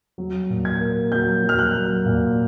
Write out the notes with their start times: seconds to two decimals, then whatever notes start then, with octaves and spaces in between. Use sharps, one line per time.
0.18 F#3
0.50 A#2
0.65 G#6
0.81 A#3
1.12 F#3 G6
1.43 F#3
1.49 F6
1.59 F#6
1.74 F#3
2.06 A#2